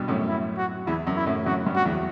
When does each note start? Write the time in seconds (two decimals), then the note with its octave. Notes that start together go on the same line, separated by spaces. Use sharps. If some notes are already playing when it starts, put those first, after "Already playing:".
Already playing: G2 B2
0.08 F#2 A2
0.29 E4
0.57 F#4
0.87 E2 E4
1.07 F#2
1.16 E4
1.26 F#2 A2
1.46 F#2 A2 F#4
1.66 G2
1.76 F#4
1.85 E2